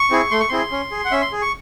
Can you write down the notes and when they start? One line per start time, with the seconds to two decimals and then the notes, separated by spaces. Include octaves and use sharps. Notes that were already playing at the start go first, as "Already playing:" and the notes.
Already playing: C#6
0.11 C4 E4 G#4
0.31 A3 C6
0.40 C#6
0.49 C4 E4 G#4 C6
0.72 C#4
0.92 G#4
1.05 F#5
1.11 C#4 E5
1.22 C6
1.32 G#4
1.42 C#6